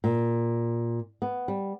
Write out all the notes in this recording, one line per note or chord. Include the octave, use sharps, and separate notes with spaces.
A#2
B3
G3